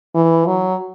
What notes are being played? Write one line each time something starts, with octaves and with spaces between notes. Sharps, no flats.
E3
F#3